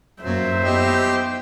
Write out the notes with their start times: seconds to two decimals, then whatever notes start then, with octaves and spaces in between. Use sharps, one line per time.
0.23 F#2 F#3 A#3 C5 E5
0.64 B3 D#4 G4